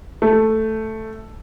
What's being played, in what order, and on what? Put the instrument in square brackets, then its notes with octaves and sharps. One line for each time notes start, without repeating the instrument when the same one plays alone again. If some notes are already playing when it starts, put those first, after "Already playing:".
[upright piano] A3